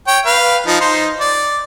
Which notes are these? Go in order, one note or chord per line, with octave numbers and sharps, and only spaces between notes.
C#5 G5
B4 F5
F3 D#4
D#4 C5
D5